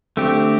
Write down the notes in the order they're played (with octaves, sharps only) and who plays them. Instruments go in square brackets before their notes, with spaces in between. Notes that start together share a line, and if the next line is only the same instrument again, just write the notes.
[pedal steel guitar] D3 A3 C4 G4